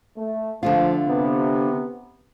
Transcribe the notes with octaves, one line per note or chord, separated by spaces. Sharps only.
A3
D3 F3 A3 F4
C3 B3